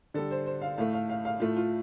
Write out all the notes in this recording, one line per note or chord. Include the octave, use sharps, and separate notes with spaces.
D3 G3 A4
C5
C5
F5
A2 A3 F5
F5
F5
F5
A2 A3 F4
F4